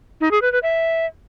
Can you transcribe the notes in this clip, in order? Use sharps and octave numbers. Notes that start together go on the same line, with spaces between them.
D#4
G#4
B4
B4
E5